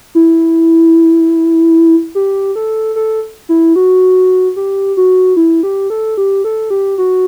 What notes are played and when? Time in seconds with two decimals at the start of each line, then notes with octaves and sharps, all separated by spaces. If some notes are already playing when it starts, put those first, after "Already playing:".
0.15 E4
2.15 G4
2.56 A4
2.96 A4
3.49 E4
3.76 F#4
4.56 G4
4.97 F#4
5.37 E4
5.63 G4
5.90 A4
6.18 G4
6.44 A4
6.70 G4
6.98 F#4